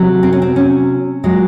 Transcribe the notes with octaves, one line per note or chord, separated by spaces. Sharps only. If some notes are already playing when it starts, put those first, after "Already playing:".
Already playing: C3 F#3
C4
C#4
C4
C#4
A#2 F#3 G#3